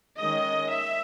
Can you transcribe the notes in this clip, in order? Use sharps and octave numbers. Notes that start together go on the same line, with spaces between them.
D#3 G#3 C#4 D#5
E5